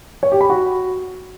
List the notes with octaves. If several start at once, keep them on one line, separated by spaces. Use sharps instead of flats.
C#5
G4
B5
F#4